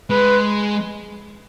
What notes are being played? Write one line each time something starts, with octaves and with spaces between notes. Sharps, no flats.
G#3 B4